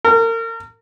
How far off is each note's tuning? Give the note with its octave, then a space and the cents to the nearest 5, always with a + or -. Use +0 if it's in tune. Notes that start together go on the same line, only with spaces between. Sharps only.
A#4 -35